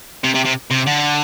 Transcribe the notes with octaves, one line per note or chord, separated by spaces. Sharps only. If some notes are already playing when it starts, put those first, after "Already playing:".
C3
C3
C3
C3
D3